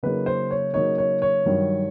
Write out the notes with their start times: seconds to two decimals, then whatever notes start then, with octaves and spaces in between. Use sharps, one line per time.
0.03 C#3 F#3 A#3 D#4 B4
0.26 C5
0.51 C#5
0.74 C#3 F#3 A#3 D#4 C#5
0.98 C#5
1.22 C#5
1.46 G2 D#3 F#3